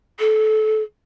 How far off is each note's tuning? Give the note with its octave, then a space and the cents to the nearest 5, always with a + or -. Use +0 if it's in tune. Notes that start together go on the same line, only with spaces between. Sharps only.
A4 -25